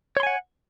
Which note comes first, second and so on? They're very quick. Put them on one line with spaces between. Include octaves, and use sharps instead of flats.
C#5 C6 G#5 F#5